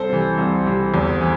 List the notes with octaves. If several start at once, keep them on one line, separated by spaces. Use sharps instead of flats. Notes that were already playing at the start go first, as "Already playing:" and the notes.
Already playing: C2 A4 C5
C3 E3
C2
C3 E3
E2
E3